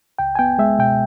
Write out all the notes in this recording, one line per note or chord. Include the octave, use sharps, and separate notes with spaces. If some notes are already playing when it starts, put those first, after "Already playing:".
C#2 G5
G#5
B3 G5
G#3 E5
B2 G5